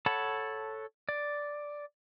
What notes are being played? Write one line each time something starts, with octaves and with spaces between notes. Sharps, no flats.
A4 C#5 F#5 A5 B5
D5